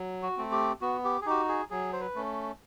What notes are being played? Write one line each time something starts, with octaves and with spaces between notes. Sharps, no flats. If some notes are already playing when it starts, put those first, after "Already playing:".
Already playing: F#3
F#4
A3 C4
G4
B3 F#4
G4
G#4
D#4 F#4 G4
G#4
F#3 G#4
C5
B4
A3 C#4